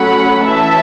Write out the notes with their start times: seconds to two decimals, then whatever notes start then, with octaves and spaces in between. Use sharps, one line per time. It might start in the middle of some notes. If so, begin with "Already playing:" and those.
Already playing: F#3 A3 C#4 F#5 B5
0.42 E3 C#4 E5 A5